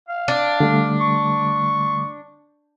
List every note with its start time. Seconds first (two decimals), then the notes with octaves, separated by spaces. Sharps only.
0.09 F5
0.28 D4
0.60 D3 G3 A3
1.00 C#6